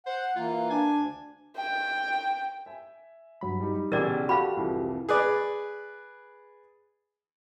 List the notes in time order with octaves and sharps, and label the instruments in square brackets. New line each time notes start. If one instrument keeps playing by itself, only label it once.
[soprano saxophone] C5 [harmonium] F#5
[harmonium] E3 A#3 [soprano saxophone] F4
[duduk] D4 [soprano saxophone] G#5
[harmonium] D2
[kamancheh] G5
[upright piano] E5 G#5
[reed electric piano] G2 F#3 B5
[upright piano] G3 D#4
[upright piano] B1 C#3 A6 [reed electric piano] E3 G4 G#4 [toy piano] A#4 D5
[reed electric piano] F#4 G4 A4 [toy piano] F5 B5 [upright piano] F6
[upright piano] C2 F2 E3
[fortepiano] G#4 B4 D5